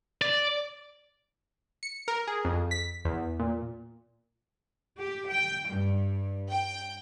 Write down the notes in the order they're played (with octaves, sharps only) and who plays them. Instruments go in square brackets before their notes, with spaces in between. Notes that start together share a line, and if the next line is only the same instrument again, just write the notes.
[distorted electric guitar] D5
[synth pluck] C#7
A#4
G#4
F2
B6
E2
A#2
[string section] G4
G5
G2
G5